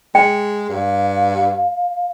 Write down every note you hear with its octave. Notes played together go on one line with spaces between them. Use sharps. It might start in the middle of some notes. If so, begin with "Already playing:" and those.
G#3 G5
G2 F5